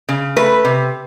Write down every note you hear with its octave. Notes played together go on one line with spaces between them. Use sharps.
C#3
A3 B4
C3